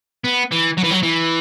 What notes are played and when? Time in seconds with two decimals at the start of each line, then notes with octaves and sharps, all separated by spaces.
0.24 B3
0.51 E3
0.77 F#3
0.83 E3
0.91 F#3
1.03 E3